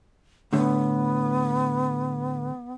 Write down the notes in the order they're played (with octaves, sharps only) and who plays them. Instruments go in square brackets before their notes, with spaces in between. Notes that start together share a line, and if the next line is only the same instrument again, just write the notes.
[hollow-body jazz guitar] A2 D3 [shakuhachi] B3